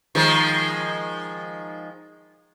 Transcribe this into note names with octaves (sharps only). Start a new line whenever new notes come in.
D#3 F3 G#3